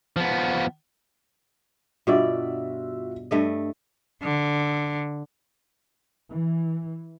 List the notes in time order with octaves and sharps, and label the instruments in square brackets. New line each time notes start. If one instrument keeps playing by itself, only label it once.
[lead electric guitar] F3 B3
[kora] G2 B2 D5 [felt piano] F4 F#4 E5
[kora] G2 A3 D#5
[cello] D3
[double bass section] E3